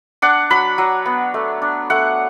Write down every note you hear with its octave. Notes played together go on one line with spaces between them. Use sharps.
D4 F#5
F#3 B5
F#3
B3
A3
D4
A3 F#5